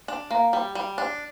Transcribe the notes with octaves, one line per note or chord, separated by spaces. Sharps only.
D4
A#3
G3
G3
D4